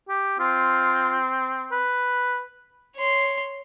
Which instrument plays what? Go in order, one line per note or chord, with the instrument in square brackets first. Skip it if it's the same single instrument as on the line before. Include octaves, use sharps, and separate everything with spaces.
[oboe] G4
[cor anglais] C4 [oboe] F4
[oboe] B4
[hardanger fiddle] C#5 C6